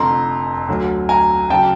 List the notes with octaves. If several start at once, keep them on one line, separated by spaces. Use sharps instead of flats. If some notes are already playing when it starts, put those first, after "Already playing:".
Already playing: F1 F2 D3 A#5 C6
D2 D3 F#3
G#5 A#5
C#3 F#3 G5 A5